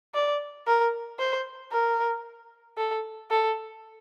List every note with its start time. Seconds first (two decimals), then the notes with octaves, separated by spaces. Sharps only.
0.14 D5
0.67 A#4
1.19 C5
1.72 A#4
2.78 A4
3.31 A4